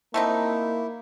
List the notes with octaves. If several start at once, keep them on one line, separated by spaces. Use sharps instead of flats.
A3 A#3 C4 D#4 E4